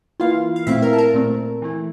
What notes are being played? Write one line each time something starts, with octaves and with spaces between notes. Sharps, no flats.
E3 A#3 E4 F4 F5
F5
A#2 A3 C4 E4 E5
A#4 A#5
A5
A#4 A#5
A#2 A3 C4
E3 A3 E4